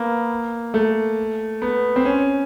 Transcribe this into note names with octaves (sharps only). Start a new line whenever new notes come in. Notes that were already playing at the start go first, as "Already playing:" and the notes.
Already playing: A#3 B3
A3
B3
C4
C#4